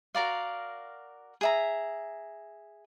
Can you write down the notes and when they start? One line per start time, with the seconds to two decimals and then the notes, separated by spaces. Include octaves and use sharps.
0.15 F#4 A#4 D5 F5
1.41 G#4 E5 A#5